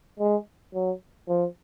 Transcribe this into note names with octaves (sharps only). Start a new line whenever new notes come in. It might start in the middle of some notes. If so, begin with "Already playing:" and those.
G#3
F#3
F3